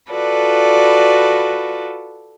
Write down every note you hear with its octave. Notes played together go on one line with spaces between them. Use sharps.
F4 F#4 A4 B4 D5